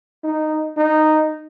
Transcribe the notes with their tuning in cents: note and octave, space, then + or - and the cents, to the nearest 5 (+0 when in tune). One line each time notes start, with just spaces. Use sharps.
D#4 -10
D#4 -10